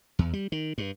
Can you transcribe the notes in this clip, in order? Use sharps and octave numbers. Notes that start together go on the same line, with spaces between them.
E2
G3
D#3
G2